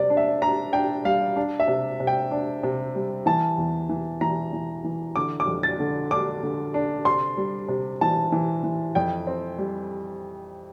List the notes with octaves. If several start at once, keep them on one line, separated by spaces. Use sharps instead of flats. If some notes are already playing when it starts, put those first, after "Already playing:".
Already playing: C3 G3 D5
D4
E5
D4 A#5
D4 G5
G3 F5
D4
E5
C3
C3
G5
D4
C3
G3
E3 A5
E2
E3
E3 A#5
E3
E3
D3 D6
D6
F2
A6
D3
D4 D6
D3
D4
C3 C6
G3
C3
E3 A5
E3
E3
F2 G5
C4
G3